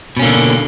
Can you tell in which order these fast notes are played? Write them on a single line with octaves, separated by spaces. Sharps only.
B2 C#4 A#3 D3